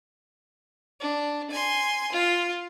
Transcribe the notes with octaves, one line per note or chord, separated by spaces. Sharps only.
D4
G#5 C6
F4